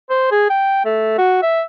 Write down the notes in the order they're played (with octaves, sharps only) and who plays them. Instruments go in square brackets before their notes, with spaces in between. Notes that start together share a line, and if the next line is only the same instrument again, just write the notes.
[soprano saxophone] C5
G#4
G5
A3
F#4
E5